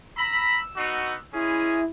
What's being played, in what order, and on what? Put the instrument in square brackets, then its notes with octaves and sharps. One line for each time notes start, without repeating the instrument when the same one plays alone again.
[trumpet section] A#5 B5 [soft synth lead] E6
[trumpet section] B3 D#4 F#4
[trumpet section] G#3 C#4 G#4 [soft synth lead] E4